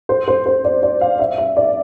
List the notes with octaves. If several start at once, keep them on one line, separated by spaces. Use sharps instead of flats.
C5
C5
C5
D5
D5
F5
E5
E5
D5